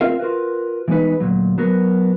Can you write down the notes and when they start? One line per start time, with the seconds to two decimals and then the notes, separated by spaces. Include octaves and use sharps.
0.01 C4 F4 A#4 E5 F5
0.19 F4 F#4 A#4 B4
0.88 E3 G#3 B3 C#4 D#4 B4
1.20 D2 G2 A#2 F#3
1.58 F#3 B3 F#4 A#4